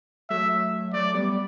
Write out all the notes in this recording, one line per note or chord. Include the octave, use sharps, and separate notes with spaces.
F#3 A3 E5
F#3 A3 D5
G3 B3